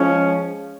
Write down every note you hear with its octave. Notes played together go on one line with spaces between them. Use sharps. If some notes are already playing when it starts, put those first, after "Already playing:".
Already playing: F3 G#3 C#4